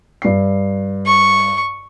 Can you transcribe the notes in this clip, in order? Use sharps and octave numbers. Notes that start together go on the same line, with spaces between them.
G2 C7
C#6